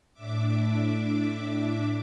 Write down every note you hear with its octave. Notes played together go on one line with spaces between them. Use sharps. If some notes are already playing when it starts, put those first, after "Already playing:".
A2 D4 E5 D6